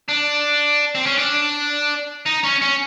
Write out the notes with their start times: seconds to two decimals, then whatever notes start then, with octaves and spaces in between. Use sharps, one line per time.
0.09 D4
0.95 C4
1.06 C#4
1.18 D4
2.26 D#4
2.44 C#4
2.62 C#4